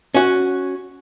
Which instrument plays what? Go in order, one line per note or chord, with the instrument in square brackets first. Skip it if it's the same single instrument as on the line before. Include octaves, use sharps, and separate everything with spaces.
[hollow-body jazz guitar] C#4 F#4